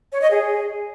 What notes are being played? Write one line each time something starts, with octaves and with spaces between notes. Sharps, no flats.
C#5
D#5
G#4